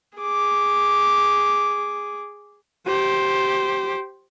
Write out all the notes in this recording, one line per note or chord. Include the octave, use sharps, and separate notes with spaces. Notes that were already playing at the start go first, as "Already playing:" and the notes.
G#4 D6
G4 C5